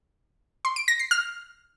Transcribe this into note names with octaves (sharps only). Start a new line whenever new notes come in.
C6
D7
A#6
C7
F6